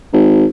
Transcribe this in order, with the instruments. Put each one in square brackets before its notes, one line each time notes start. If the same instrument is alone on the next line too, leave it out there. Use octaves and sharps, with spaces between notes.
[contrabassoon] G#1